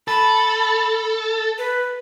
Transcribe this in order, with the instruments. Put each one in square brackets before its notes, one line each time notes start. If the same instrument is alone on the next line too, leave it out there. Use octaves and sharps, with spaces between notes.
[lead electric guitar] A4 [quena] B5
[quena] B4